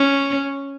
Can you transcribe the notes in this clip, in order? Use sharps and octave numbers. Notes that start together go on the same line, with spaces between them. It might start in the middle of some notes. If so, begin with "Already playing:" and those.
Already playing: C#4